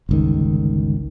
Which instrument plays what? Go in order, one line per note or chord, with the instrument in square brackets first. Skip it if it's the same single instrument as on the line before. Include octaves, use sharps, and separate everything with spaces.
[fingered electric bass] G1 C#2 D#3